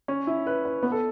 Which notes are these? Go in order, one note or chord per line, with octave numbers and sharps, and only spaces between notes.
C#4
E4
B4
B4
B3
A4